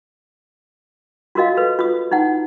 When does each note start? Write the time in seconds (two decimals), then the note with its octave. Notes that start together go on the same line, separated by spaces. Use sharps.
1.35 F4 F#4 A#4 D#5 F5
1.57 A4 B4
1.79 F4 D#6
2.11 D#4 E4 F#5